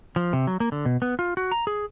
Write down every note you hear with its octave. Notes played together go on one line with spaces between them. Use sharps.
F3
C3
F#3
A#3
D3
B2
B3
F4
F#4
A#5
G#4